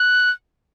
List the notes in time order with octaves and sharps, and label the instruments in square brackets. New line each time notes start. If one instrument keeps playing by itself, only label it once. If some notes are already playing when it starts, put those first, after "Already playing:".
Already playing: [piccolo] F#6